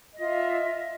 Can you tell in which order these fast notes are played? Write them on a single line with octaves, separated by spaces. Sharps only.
D#5 F4 E5